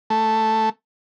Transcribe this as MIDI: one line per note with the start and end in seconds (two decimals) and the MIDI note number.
0.10 0.69 57